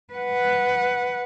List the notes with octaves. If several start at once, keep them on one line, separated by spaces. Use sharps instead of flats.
B4 F#5